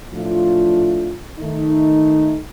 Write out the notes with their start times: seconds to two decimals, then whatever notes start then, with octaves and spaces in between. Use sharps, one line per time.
0.13 A2 F3 A3 D4 F4
1.40 D#3 A3 D#4